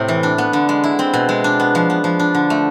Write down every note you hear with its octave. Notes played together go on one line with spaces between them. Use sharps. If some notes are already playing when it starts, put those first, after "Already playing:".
Already playing: A2 C3 C4
E3
D4
B3
D3
G#3
E4
C4
B2
G#3
D4
B3
F3
B3
F3
D4
D3
A3